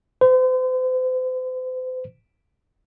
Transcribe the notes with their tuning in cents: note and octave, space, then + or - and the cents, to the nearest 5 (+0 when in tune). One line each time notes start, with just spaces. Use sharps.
C5 -40